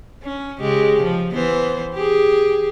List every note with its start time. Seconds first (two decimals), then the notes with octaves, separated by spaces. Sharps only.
0.23 C#4
0.60 C#3 G#3 G4
1.03 F3
1.34 E3 B3 C5
1.94 G4 G#4